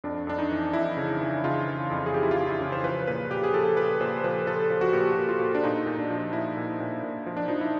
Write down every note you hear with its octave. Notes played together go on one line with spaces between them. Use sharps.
F2 D4
F2 D4
D#4
E3
F2 E4
C#3
E3
C#3 F4
E3
F2
G#4
C#3 G4
E4
F4
E3
E4
C#3
C5
F3 B4
A#2 B4
A#2 G4
G#4
F3 A4
A#2 B4
A#2 C5
F3 B4
F3 A4
F3
F#4
A#2 G4
F#4
A#2
F4
A#2
D4
A#2 D#4
A#2
D4
F3
A#2 E4
A#2
A#2
A#2
F3
D4
F3 D#4
E4